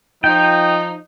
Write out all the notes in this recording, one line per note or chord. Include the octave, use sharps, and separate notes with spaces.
F3 D#4 G5